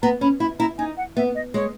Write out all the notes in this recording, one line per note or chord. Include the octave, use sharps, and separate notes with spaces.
B3 A#5
C#4 B5
E4 B5
E4 A#5
D#4 G#5
F#5
B3 E5
D#5
G#3 C#5